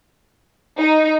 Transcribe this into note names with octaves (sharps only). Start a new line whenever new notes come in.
D#4